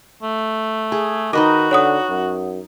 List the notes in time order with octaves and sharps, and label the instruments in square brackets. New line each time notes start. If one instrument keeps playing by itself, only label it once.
[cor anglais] A3
[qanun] G#4
[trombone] D#3 [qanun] D#4 B4 D#5 [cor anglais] F#4 [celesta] D6
[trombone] D3 [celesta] C#5 F#5 D#6
[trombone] F#2